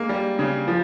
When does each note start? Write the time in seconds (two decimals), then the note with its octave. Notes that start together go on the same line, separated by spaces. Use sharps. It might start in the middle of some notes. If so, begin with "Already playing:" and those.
Already playing: G#3 A#3
0.09 G3
0.39 C#3
0.68 F3